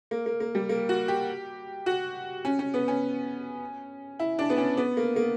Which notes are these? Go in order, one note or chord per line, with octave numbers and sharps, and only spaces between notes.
A#3
A#3
A#3
G3
A#3
F#4
G4
F#4
C#4
C#4
B3
C#4
E4
D4
B3
C#4
B3
A#3
A#3